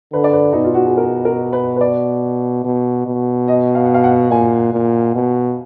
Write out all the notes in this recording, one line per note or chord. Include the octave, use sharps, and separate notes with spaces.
D3 B4
D5
B4
B2 D#4
F4
F#4
G#4
A#4
A#4
B4
B4
D5
B2
B2
D#5
F5
F#5
F5
F#5
A#2 G#5
A#2
B2